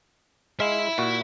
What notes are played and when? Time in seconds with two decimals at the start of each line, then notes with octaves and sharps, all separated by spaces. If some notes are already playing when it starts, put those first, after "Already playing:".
0.60 G#3 E5 F5 B5
0.98 A#2 F#4